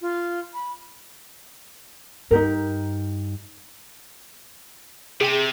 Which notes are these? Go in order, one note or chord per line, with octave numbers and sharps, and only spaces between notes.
F4
B5
G2 D#4 G4 A#4
C3 G#4 G5 D#7